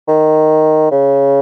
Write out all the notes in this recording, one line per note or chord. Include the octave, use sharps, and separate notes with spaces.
D#3
C#3